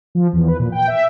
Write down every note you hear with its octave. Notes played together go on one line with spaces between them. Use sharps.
F3
E2
B4
A#2
G5
E5